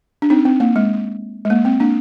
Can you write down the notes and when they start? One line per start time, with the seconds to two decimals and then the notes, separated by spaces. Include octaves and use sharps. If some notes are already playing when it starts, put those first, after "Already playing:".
0.22 D4
0.30 C4 D#4
0.45 C4
0.60 A#3
0.76 G#3
1.45 G#3
1.50 A#3
1.65 C4
1.80 A#3 D4